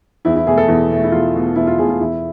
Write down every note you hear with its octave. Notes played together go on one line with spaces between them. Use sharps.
E2 E4
E4
B2 A3 G#4
A4
E2
B2 A3
E4
E2 F4
B2 A3
E2 E4
F4
B2 A3 G#4
F4
E2 E4